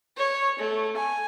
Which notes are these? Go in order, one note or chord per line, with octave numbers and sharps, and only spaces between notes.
C#5
A3
G#5